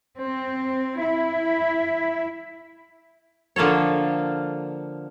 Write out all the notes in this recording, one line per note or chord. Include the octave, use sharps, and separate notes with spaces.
C4
E4
D3 F3 A#3 A4 C#5